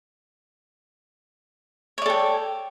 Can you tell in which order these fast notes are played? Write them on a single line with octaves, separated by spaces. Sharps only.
C#5 D5 A4 G5